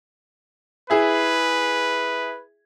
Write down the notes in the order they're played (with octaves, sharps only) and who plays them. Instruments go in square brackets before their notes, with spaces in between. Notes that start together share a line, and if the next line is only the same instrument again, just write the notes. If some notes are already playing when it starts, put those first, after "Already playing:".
[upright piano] E4 G#4 E5 [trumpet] B4